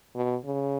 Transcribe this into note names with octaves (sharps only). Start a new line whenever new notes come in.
B2
C#3